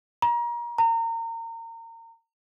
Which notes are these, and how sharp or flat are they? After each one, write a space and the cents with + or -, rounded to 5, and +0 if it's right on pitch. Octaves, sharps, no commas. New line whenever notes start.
A#5 +30
A#5 -30